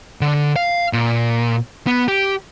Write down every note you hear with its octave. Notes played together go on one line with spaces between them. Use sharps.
D3
F5
A#2
B3
G4